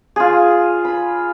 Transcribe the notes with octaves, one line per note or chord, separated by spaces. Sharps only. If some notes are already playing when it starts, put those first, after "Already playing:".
F4 G#4
B5